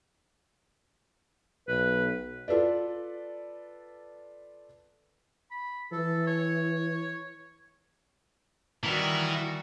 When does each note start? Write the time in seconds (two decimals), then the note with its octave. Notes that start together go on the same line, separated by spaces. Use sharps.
1.68 B1 B4
2.48 F4 A4 B4 D5
5.51 B5
5.92 E3 A4
6.27 C#5
8.84 D#3 E3 G3 E4 F#4